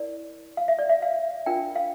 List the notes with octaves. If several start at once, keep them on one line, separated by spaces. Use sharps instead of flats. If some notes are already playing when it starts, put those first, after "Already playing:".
Already playing: E4 A#4 D5
F5
E5
D5
E5
F5
D4 F4 A#4 G5
F5